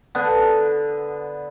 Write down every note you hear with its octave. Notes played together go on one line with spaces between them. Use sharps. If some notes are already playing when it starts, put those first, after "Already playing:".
D3 B3